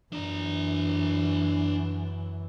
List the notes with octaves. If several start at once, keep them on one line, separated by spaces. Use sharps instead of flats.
F#2 E3 D4 A#5